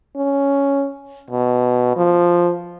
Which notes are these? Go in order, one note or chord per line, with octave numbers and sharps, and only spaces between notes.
C#4
B2
F3